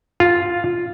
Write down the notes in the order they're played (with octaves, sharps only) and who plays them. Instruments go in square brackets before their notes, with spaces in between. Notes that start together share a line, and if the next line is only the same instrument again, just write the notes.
[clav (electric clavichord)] F4